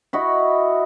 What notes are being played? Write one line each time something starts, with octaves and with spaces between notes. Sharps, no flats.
E4 F#4 D#5 B5